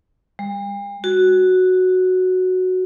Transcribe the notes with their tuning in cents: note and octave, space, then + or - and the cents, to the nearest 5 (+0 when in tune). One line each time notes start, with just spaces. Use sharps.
G3 +45
F#4 +0